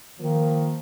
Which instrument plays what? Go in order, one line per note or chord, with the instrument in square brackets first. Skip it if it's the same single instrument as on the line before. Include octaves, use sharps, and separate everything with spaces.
[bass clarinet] D#3 [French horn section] F3 A#3